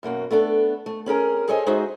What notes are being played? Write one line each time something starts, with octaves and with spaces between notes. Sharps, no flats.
F#2 B2 A#3 F#4
A3 B3 D4 A4
A3
C4 C#4 G#4 A#4
G#4 A4 C5 C#5 D#5 G#5
G#3 D#4 F#4 G#4 C5 E5